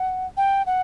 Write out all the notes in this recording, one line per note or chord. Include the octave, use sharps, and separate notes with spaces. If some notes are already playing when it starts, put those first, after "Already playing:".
Already playing: F#5
G5
F#5